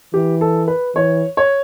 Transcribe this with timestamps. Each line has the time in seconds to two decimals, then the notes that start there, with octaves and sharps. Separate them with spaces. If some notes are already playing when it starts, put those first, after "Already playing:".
0.13 E3 G4
0.41 A4
0.68 B4
0.95 E3 C#5
1.37 C#5